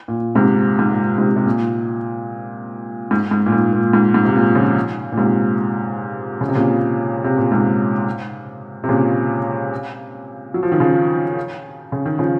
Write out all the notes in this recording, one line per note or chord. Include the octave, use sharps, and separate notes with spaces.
A#2
G#2 C3
G#2
A#2
G#2 C3
C3
A#2
G#2
G#2
A#2
G#2
A#2
G#2
G#2
C3
A#2
C#3 F3
A#2
G#2 C3
C#3
C3
A#2 C#3
C3
A#2
G#2 C3
C3
A#2 C#3
F#3
F3
D#3
C#3 F3
C#3
D#3
C#3 F3